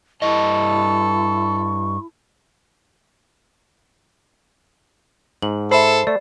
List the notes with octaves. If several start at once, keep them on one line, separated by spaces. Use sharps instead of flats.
G2 E4 A4 D#5 C#6
G#2 F#7
A4 C5 E5 B5
A3 D5